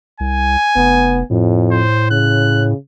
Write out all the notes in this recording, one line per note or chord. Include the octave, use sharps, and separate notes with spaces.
C2 G#5
F1 B3
F2 A2
C5
C#3 F#6